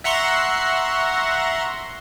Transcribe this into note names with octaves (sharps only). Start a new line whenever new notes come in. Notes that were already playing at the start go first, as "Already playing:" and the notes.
E5 F#5 A#5 C6 C#6